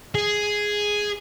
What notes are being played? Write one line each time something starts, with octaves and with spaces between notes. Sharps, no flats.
G#4